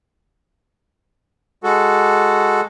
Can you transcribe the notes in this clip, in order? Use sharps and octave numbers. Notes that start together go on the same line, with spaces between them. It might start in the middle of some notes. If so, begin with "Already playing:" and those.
G#3 F#4 A4